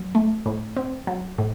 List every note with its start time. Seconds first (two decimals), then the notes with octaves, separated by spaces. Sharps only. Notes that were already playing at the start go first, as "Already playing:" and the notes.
Already playing: F#3
0.15 A3
0.46 A2
0.77 C4
1.07 F#3
1.38 A2